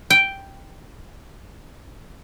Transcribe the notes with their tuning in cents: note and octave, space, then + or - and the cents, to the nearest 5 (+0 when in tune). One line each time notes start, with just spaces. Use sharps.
G5 +0